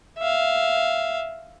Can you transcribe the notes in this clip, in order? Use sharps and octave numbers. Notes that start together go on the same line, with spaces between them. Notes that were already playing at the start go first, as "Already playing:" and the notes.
E5 F5